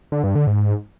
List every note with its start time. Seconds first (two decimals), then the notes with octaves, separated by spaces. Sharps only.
0.12 D3
0.24 G2
0.35 D3
0.47 G#2